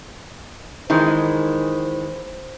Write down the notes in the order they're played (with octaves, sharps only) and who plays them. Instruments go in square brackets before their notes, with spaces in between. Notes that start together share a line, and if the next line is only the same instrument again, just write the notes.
[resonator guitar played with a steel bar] D#3 E3 G#3 [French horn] C5